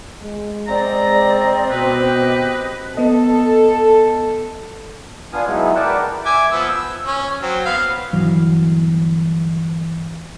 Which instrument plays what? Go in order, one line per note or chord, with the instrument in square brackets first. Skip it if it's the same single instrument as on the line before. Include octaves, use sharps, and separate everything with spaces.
[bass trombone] G#3
[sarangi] C4 [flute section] D5 D#5 [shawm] A#5
[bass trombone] B2 [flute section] G4 D#5 [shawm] B4
[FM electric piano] B3 D#5 [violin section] A4
[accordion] B3 D4 F4 F5 G#5 D#6
F#3 G#3 B3 D#4 E4
A#4 B4 D5 F#5 G5 A5
[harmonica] E5 G#5 D6
F3 B3 E6
E6
C#4
F#3 C4
B3 F5
[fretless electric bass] G1 E3 F#3